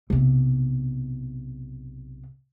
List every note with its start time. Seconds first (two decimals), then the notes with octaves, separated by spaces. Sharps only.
0.10 B1 C3